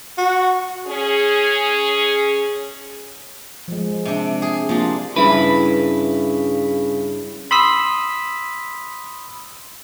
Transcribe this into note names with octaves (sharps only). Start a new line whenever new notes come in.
F#4
C#4 G#4
F3 G#3
C3 D4
G#4
F3 A#3 D4 F4
G2 C#3 E4 B4
B5 C6 D#6 E6 B6